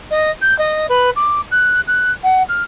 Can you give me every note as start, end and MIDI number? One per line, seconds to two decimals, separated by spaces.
0.11 0.31 75
0.41 0.56 91
0.58 0.86 75
0.89 1.10 71
1.16 1.41 86
1.51 1.80 90
1.87 2.12 90
2.23 2.43 78
2.49 2.63 89